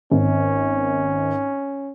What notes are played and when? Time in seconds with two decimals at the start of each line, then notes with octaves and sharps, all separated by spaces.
0.12 G#1 C#4